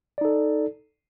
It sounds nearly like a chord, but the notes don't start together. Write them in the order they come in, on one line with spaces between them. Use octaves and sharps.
D5 D#4 A4